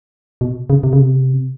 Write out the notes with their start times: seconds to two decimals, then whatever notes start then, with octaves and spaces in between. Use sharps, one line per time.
0.41 B2
0.70 C#3
0.83 C3
0.93 C#3
1.01 C3